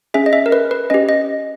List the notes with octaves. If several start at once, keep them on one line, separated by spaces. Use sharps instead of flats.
C#4 G#4 E5
D#5
E5
A#4
B4
B4
C#4 G4 D#5
D#5